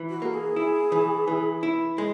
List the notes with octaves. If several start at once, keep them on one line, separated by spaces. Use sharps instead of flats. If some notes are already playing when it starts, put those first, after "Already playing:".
Already playing: E3
F#4
A#3 A#4
G#4
E4
E3
E3
E4
G#3 G#4